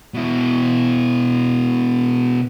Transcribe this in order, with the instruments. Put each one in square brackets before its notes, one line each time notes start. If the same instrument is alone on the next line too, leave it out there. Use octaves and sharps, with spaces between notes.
[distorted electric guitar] B2 E4